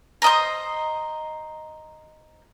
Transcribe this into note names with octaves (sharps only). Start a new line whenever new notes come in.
C5 D#5 A#5